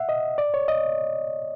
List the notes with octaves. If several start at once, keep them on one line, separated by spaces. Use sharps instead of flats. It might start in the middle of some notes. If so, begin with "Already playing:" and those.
Already playing: E5 F#5
D#5
D5
C#5
D#5